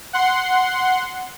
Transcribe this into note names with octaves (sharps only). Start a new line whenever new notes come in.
F#5 C6